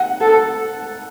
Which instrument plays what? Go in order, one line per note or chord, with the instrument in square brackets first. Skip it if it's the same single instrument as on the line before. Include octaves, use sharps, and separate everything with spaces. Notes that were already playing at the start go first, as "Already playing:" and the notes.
Already playing: [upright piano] F#5
[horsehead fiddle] A4